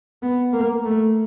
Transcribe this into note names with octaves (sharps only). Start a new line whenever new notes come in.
B3
A#3
A3